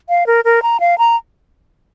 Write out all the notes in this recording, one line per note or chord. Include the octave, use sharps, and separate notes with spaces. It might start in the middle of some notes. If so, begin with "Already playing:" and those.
F5
A#4
A#4
A#5
F5
A#5